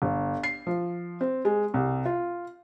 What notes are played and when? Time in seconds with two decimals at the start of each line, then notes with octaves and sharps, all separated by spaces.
0.02 G1
0.43 C7
0.67 F3
1.21 C4
1.45 G#3
1.74 C2
2.05 F4